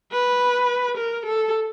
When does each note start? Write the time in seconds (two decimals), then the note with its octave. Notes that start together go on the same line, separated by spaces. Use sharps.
0.12 B4
0.97 A#4
1.26 A4